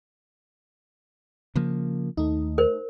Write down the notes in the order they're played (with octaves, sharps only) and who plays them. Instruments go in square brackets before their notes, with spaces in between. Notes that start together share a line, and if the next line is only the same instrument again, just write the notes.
[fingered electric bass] C#3 F3 A#3
[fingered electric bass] D#2 [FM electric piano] A3 D#4
[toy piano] A#4 C5